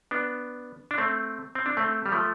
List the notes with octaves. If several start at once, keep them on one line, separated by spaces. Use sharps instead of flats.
B3 D4
D4
A3 C4
C4
D4
A3 C4
G3
F3 A3